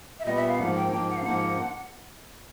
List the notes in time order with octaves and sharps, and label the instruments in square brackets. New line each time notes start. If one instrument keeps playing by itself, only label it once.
[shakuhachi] E5
[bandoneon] A#2 G3 B3 [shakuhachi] D#5
[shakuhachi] E5
F5
[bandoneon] G#2 F3 A#3 [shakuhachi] F#5
[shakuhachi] G5
[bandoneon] G#2 F3 A#3 [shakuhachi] G5
[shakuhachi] F#5
F5
[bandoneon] G#2 F3 A#3 [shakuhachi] F#5